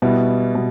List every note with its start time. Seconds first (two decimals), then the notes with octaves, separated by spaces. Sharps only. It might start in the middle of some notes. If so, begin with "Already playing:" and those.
0.02 B2 G3 B3 E4
0.55 B2